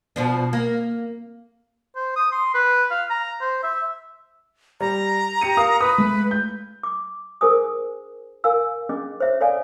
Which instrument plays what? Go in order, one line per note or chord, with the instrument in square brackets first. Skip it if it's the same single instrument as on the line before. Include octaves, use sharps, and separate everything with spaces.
[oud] B2 F3 D4
A#3
[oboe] C5
D#6
C6
B4
F5
A#5
C5
E5
[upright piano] G3 [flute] A#5
[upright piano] G4 C#7 D#7
A#4 F5 D#6
[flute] B4 [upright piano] D#6
[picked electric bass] G#3 A3
[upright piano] G6
[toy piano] D6
D4 G#4 A#4 C5 G#5 D#6
A#4 F5 G#5 E6
C#4 D4 G#4 D#5 D6
C5 C#5 E5
A4 C#5 D5 F5 G#5